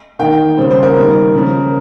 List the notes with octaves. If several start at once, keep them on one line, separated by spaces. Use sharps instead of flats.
D#3 A#3 G5
C#3 G3 A#3 C5
C5
A#4
D#3 G3 A#3
C#3 F3 A#3